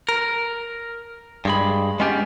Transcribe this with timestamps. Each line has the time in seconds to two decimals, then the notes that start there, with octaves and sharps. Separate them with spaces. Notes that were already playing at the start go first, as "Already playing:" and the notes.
0.09 A#4
1.45 G2 G#3 B5
2.00 G#3 B3 C#4 D4 G4